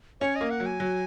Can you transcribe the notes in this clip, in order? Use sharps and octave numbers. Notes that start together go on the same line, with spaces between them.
C#4 C#5
D#5
A#3
F#5
F#3
G#5
F#3